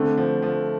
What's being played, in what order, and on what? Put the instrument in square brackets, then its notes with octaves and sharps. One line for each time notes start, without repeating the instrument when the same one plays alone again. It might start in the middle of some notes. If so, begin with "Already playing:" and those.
Already playing: [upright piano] D3 [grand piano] A3 C4
[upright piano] F3
F3